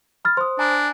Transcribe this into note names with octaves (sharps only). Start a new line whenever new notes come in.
B5 F6 A6
C5 C6 D#6
D4 G#5 A#5